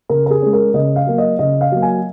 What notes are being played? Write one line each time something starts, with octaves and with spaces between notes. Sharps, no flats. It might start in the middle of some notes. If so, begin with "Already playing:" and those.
C#3 A#4
A#4
G#4
G#3 C#4
A#4
C#3 D#5
F5
F#3 A#3
D#5
C#3 D#5
F5
F#3 A#3
G#5